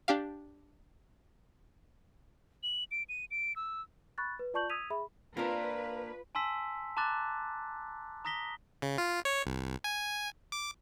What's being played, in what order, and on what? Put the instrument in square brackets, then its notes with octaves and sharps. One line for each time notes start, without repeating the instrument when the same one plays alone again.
[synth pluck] D4 G4 F5
[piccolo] F#7
D7
D#7
D7
E6
[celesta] B5 C#6 F#6 A6
B4
F4 D5 A5 C#6 G6 F#7
D#6 E6 G#6 B6 D#7 F7
G#4 E5 B5
[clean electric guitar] A#3 A#4 [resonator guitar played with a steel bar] C4 D4 [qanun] F4 [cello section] B4
[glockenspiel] G#5 A5 C6 E6 B6
A5 A#5 C6 D6 F#6 A6
A#5 D#6 A#6 B6 G7
[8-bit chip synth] C#3
F4
C#5
C2
G#5
D6